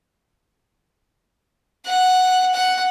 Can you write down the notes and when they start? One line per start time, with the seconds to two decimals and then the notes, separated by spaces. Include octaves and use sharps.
1.86 F#5
2.54 F#5